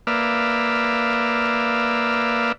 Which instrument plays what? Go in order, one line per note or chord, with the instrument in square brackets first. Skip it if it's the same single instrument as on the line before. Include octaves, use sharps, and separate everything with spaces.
[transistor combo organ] A#3 B4 D5 E5 F5